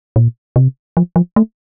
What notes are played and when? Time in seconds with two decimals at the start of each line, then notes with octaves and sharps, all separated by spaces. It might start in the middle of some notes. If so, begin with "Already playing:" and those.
0.16 A#2
0.56 C3
0.97 F3
1.16 F3
1.36 A3